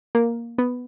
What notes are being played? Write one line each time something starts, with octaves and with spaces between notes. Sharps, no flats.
A#3
B3